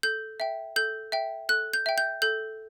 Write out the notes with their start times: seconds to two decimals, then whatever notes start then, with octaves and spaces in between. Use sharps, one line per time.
0.03 A4 G6
0.40 E5 G5
0.76 A4 G6
1.12 E5 G5
1.49 A4 F#6
1.73 G6
1.86 E5 G5
1.98 G6
2.22 A4 G6